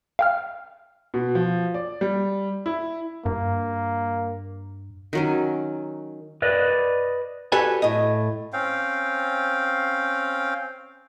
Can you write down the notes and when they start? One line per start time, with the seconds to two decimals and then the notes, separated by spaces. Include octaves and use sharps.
0.19 F5 G5 F6
1.14 B2
1.35 F3
1.74 D5
2.01 G3
2.66 E4
3.26 G2 A#3
5.13 D#3 F#3 C#4
6.42 B4 D5 D#5
7.52 F#4 G4 A4 B4 D5 G#5
7.82 A2 D#5
8.53 C4 C#4 F5 G5